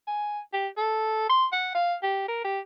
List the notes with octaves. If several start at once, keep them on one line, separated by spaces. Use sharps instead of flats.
G#5
G4
A4
C6
F#5
F5
G4
A#4
G4